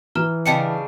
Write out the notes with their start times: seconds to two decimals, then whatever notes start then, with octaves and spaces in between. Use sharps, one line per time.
0.15 E3 A#5 F6 G7
0.46 C#3 G3 D4 D#5 G5 C#7